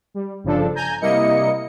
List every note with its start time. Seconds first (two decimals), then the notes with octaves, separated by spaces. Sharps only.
0.14 G3
0.43 G1 C#3 F3 D4 A4
0.75 G#5 A#5 G6
1.01 C3 G3 A#3 E4 D#5 C#7